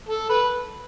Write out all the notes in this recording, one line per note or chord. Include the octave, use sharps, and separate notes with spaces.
A4
B4